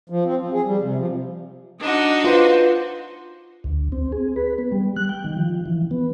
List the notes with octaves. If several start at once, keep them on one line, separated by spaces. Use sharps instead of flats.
F3
C4
F3
G#4
G3
C3
F3
D4 D#4 F#4 D#5
F4 B4 C5
D2
C4
G#4
B4
B3
G3
F#6
G5
D#3
F3
E3
B3